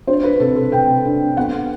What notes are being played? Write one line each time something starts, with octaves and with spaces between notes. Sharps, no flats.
D4 C5
B4
C3 A4
A4
C3 G5
D4
B3 F#5